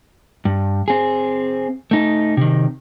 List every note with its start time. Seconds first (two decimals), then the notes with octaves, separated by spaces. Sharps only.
0.45 G2
0.88 C4 G#4
1.91 A3 D#4
2.37 C3 D#3